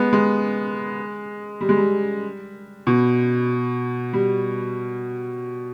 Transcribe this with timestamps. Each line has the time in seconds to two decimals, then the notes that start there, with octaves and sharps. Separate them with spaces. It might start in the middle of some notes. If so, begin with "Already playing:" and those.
Already playing: G#3 B3
0.13 G#3
1.61 G3
1.69 G#3
1.77 G3
2.87 B2
4.13 G3